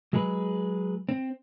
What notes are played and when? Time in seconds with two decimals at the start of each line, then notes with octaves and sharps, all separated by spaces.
0.13 F#3 G#3 G#4 B4
1.09 C4